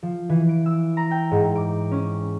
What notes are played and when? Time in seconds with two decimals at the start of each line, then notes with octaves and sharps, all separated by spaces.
0.03 F3
0.29 E3
0.49 D7
0.66 E6
0.97 A#5
1.11 G5
1.31 G#2
1.56 D6
1.91 C#4